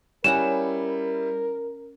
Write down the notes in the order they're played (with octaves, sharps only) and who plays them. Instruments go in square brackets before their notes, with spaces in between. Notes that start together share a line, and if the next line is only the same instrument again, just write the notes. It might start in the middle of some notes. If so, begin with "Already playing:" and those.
[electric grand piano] G3 E4 [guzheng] C#4 F#4 A#5 [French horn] A#4 [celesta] E7